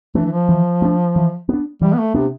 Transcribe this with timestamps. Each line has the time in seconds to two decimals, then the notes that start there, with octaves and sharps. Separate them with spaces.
0.15 E3 A3
0.18 D4
0.26 E3
0.32 F3
0.49 E3
0.82 A3 D4
1.16 E3
1.49 B3 D4
1.81 E3 G3
1.93 B3
1.99 A3
2.14 C3 B3 D4